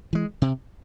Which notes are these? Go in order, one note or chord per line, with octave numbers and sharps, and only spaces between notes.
E3 G#3
C3